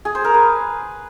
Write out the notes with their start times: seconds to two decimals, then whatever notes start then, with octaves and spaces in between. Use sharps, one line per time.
0.05 G#4
0.15 C5
0.24 A#4
0.34 B4